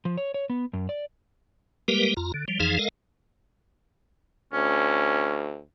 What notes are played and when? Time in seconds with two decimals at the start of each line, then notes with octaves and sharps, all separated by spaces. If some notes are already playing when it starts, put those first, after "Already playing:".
0.05 F3
0.17 C#5
0.34 C#5
0.50 B3
0.73 F#2
0.89 D5
1.88 G3 G#3 A#3 G4 A#4 B4
2.17 F2 F4 A#5
2.34 D3
2.48 F3 G3
2.60 F2 E3 F3 D#4 G#4 F5
2.79 G#3 A4 A#4 D#5 F5
4.53 D2 C#4